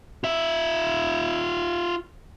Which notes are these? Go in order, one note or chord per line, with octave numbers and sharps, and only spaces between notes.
F4 E5